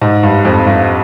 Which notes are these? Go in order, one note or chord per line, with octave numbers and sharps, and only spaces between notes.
G#2
G2
F2
G2